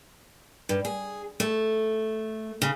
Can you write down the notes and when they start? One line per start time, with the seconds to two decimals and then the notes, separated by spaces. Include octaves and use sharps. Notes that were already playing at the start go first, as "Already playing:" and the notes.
0.69 G2
0.85 G#4
1.40 A3
2.62 C#3